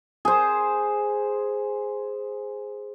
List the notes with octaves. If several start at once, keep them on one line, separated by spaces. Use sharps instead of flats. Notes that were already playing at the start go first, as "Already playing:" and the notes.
G#4 C5